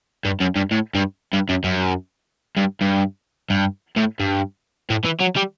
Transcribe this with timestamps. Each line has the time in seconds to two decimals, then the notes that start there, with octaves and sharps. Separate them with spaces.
0.25 G2
0.40 F#2
0.56 G2
0.71 A2
0.95 G2
1.33 G2
1.49 F#2
1.64 F#2
2.57 G2
2.81 G2
3.50 G2
3.96 A2
4.20 G2
4.90 A2
5.05 E3
5.21 F#3
5.37 G3